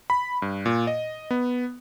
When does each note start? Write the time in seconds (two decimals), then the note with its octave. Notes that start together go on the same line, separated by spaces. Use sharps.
0.10 B5
0.42 G2
0.66 A#2
0.87 D#5
1.31 B3